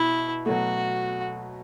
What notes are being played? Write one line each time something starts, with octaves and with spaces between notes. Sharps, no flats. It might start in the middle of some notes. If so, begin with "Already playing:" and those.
Already playing: B2 E4
B2 F#3 A3 F#4